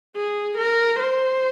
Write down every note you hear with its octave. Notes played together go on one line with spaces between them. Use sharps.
G#4
A#4
C5